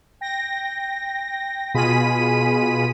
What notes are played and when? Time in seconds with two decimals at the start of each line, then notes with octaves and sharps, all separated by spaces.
0.21 G5 A#6
1.74 B2 F4 G#4 B5 B6 D#7